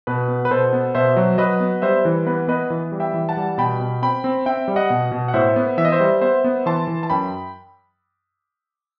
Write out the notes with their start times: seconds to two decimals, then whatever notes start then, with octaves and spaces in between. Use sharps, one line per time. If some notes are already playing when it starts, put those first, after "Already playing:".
0.07 B2 B4
0.28 B3
0.45 B4
0.51 B2 A4 C5
0.73 B3
0.95 B2 C5 E5
1.16 F#3
1.38 F#3 B4 D#5
1.60 B3
1.82 G3 C5 E5
2.04 E3 B4
2.27 B3 B4
2.48 B3 B4 D#5
2.70 E3
2.92 G3
3.00 E5 G5
3.14 E3
3.29 F#5 A5
3.37 G3
3.58 B2 G5 B5
3.80 B2
4.02 C4 G5 B5
4.24 C4
4.46 C4 E5 G5
4.68 G3
4.76 D#5 F#5
4.90 B2
5.12 B2
5.28 F#5
5.34 A2 C5 E5
5.56 B3
5.78 E3 E5
5.85 D#5
5.92 C5 E5
6.00 G3
6.21 B3 C5 E5
6.44 B3
6.66 E3 A5 C6
6.87 E3
7.03 A5
7.10 F#2 G5 B5